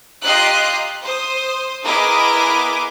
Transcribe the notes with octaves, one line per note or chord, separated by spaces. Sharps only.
F4 G4 D#5 A#5 F#6 C7
C5 D#6
B3 E4 G#4 A#4 D#5 D6